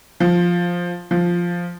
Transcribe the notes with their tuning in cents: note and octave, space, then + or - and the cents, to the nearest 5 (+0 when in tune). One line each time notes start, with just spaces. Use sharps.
F3 +5
F3 +0